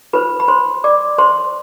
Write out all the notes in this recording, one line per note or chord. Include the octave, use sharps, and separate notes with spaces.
F4 B4 C5 B5
B5
C5 C6
D5 D6
C5 C6